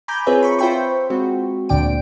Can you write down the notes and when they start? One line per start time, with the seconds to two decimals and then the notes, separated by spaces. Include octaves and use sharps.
0.08 G#5 A#5 B5 D6 G6
0.26 C4 F4 G#4 B4 C#5 E5
0.43 B5 C#6
0.59 F4 C5 E5 G5 B5 C#6
1.10 G#3 C4 F#4
1.69 D2 A#2 D3 D5 G5 D7